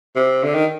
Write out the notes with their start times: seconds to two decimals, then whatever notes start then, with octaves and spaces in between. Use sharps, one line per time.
0.16 C3
0.43 D3
0.54 D#3